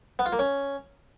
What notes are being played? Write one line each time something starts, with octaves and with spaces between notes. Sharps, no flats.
B3
F4
A#3
C#4